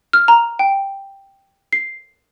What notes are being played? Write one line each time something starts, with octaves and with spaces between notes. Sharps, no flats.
F6
A#5
G5
C7